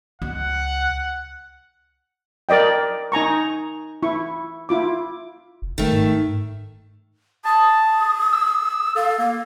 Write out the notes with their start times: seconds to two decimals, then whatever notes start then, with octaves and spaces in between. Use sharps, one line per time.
0.22 C#2 F#5
2.49 A#4 D5 D#5 G5
3.12 D#4 G#5 A#5 C#6
4.03 E4 C#6
4.69 E4 F4 D6
5.62 F1
5.78 F#1 D#3 A3
5.92 G#2
7.45 A5 D#6
8.33 E6
8.96 A4 F5
9.19 A#3 F5